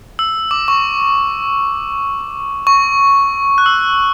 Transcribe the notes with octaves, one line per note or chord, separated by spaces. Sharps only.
E6
D6
C#6
C#6
F#6
E6